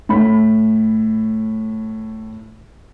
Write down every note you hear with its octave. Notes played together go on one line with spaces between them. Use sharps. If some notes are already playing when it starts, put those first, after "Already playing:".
A2 B5